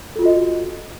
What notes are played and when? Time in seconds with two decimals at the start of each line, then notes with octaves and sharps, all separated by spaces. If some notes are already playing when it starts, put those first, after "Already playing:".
0.16 A4
0.19 F4
0.22 F#4
0.26 D#5